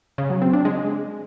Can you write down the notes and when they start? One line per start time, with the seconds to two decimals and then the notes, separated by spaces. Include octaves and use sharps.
0.18 C#3
0.30 F#3
0.42 C4
0.53 D4
0.65 G#3